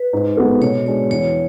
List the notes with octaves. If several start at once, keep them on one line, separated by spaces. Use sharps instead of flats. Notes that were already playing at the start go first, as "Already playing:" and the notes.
Already playing: B4
G#2
G#3 B3 F#4 A4
B2 C#5
G#3 D4 C#5
E2 C#5